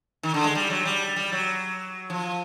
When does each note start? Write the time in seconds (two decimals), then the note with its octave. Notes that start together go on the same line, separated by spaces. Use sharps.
0.23 D#3
0.34 D3
0.44 G#3
0.55 G3
0.70 F#3
0.85 G3
1.16 G3
1.32 F#3
2.10 F3